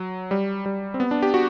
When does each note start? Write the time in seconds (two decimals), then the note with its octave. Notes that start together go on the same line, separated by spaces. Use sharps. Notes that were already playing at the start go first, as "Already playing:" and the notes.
Already playing: F#3
0.31 G3
0.66 G3
0.94 C4
1.00 B3
1.11 D4
1.22 G4
1.34 F#4